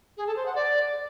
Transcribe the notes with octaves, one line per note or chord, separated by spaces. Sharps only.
G#4
A4
C5
F#5
D5